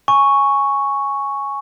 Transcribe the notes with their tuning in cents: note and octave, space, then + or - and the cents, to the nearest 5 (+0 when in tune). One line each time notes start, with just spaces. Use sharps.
G#5 +0 C#6 +0